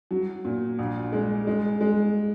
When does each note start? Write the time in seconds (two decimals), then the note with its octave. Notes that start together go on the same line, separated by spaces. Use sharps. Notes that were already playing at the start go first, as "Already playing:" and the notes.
0.11 F#3
0.45 A#2
0.79 A#1
1.12 G#3
1.47 G#3
1.81 G#3